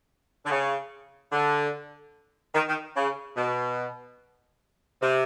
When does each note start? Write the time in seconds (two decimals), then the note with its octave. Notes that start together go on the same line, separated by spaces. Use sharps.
0.46 D3
0.51 C#3
1.32 D3
2.55 D#3
2.68 D#3
2.96 C#3
3.37 B2
5.01 C3